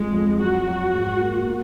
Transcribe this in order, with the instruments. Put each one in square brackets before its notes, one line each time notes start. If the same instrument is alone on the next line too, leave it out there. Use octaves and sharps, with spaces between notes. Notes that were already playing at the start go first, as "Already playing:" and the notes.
Already playing: [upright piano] F2 [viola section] G#3
[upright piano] F2
[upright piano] F#3 [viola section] F#4
[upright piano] F#3
G#2
A#3
A#3